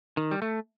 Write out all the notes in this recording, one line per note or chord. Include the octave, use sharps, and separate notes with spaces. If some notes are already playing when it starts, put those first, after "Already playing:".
D#3
G3
A3